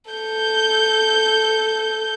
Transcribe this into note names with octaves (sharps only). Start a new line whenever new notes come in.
A4 G6